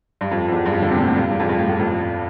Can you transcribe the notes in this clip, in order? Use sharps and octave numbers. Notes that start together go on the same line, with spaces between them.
G2
F2
F2
E2
G2
F2
D3
C3
A#2
A2
G2
E2
F2
G2
A2
A2
F2